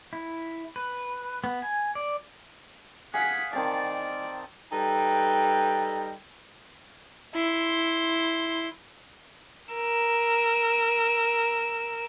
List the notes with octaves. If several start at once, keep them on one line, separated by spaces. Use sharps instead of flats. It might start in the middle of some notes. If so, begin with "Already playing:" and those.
E4
B4
B3
G#5
D5
G#4 F5 F#5 B6
D#3 C4 D5 A5
G3 D#4 A4 B4 G5
E4 C6
A#4 E6